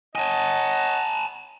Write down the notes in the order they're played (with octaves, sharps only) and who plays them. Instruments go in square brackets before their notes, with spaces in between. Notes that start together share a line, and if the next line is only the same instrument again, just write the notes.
[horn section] C#5 D#5 F#5 [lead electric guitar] G#5 A5